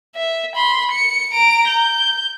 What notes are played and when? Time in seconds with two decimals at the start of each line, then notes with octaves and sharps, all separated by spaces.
0.16 E5
0.56 B5 C6
0.92 C#7
1.33 A#5 D7
1.68 G6